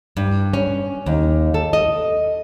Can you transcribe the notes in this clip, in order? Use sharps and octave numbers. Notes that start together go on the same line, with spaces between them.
G2
C#4
D#2
A4
D#5